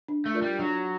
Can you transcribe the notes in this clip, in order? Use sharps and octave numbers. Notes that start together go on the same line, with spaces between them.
D4
A3
F4 A#4 D5
G3
F#3 D4